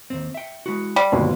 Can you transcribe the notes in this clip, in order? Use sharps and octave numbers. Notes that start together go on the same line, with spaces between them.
D#2 G#2 C4
E5 G5
G#3 E4 F#4
G3
G1 D#2 B2 A3 C4